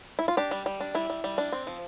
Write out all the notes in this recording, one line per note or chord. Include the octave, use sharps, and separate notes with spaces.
E4
F4
D4 G4
G3
G3
D4
G3 E4
G3
G3
D4
C4
F3